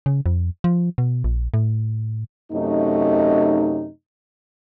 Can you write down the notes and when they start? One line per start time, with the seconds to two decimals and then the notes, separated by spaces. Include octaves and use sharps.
0.06 C#3
0.26 F2
0.64 F3
0.98 B2
1.24 A#1
1.54 A2
2.52 F#2 C3 A3 D#4